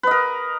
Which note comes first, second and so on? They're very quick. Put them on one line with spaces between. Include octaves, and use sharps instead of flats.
B4 D#5 A#4